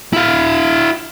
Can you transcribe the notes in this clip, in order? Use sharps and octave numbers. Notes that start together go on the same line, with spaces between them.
E4 F5